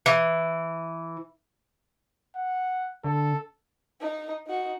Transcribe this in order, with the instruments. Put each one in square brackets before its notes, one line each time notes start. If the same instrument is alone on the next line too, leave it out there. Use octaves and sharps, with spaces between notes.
[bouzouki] E3
[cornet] F#5
[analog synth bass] D3 [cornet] A4
[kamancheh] D#4
D#4 F#4